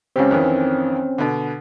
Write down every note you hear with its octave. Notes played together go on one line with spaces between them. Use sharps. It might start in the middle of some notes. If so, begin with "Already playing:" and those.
C#2 C#3 C4 C#4 G4
F2 D#3 E3
B2 D3